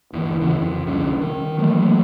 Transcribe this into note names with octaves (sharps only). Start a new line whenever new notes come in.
G1 D#2 E3
D1 C#3 E3
F2
G1 C2 D3 C#4
D#3
E3 F#3 A3 A#3